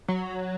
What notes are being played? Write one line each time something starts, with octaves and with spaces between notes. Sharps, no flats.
F#3